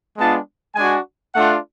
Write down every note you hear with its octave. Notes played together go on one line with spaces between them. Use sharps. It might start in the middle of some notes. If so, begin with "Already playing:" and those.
G#3 B3 D4 F4 A5
G#3 D4 F#4 G#5
A3 D4 F4 F#5